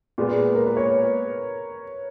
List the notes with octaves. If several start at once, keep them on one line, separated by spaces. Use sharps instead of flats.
A#2 G#3 B3
A#4
B4
C#5